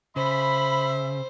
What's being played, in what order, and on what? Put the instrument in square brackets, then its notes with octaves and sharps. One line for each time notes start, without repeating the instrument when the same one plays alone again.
[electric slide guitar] C#3 [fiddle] C5 [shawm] E5 [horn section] B5